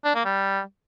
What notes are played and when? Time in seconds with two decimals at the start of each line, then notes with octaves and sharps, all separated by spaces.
0.05 D4
0.15 A#3
0.25 G3